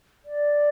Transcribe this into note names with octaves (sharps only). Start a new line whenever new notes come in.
D5